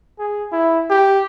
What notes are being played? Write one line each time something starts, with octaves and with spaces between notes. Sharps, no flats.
G#4
E4
G4